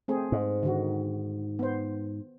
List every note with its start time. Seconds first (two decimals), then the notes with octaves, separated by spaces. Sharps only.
0.08 A3 C4 G#4
0.32 G#2
0.63 D3 D#3 F#4
1.59 B3 C5